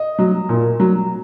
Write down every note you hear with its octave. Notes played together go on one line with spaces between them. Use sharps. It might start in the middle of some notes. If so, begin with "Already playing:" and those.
Already playing: D#5
F#3
A#2
F#3